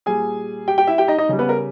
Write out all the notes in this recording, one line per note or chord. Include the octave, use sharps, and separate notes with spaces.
A#2 G3 G#4 G#5
G4 G5
G4 G5
E4 E5
G4 G5
D#4 D#5
D#4 D#5
C#3 G3
B3 B4
A#4